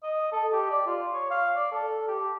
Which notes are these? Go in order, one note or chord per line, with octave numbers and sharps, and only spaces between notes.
D#5
A4
G4
D5
F4
C#5
F5
D5
A4
G4